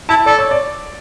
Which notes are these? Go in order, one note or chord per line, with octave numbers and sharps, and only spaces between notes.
E4 A5
A4 D5
C#5
D5